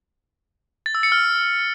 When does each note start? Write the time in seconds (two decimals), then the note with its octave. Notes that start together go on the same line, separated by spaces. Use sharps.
0.86 A6
0.95 E6
1.03 C#7
1.12 F6